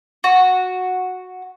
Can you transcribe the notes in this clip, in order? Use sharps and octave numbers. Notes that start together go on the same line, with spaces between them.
F#4